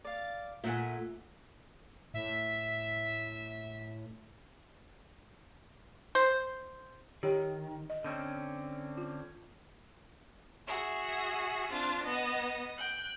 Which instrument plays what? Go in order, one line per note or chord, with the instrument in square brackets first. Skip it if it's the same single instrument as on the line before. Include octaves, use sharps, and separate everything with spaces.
[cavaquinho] D5 F5
[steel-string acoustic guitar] A#2 A3 [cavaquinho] E5 F#5 G#5
[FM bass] A2 [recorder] E5
[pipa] C5
[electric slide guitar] D#3 [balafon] G4 C#5
[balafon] D#5
[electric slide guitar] D3 C4 C#4
[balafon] F4
[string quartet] F#4 G#4 E5
C4 D4 F4
B3 D#5
G5 F#6